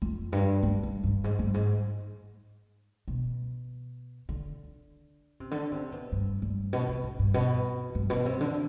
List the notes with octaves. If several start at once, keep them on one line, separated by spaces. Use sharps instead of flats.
F2
G2
G2
G2
G2
G#2
G2
G#2
B2
D3
C3
D3
C3
B2
G2
G2
B2
C3
G#2
G2
B2
G2
B2
C3
D3